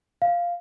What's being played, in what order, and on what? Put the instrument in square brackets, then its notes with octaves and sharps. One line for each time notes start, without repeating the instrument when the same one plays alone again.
[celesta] F5